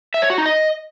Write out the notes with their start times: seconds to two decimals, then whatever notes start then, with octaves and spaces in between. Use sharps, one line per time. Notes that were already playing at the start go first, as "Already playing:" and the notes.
0.14 E5
0.22 C#5
0.30 F#4
0.38 D#4
0.46 D#5